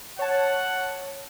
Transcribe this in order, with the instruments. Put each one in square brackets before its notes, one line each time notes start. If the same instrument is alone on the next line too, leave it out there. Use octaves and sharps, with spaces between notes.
[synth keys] C#5 A5 [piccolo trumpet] F#5